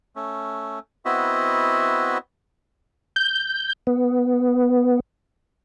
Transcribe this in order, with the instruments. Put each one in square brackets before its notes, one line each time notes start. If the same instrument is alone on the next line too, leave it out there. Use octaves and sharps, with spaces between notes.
[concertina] A3 C#4
B3 C4 E4 F#4 D#5 E5
[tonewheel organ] G6
B3